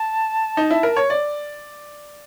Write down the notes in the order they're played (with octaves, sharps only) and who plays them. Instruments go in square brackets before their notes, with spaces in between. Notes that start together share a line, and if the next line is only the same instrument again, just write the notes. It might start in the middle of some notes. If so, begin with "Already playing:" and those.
Already playing: [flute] A5
[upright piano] D#4
E4
A#4
C#5
D5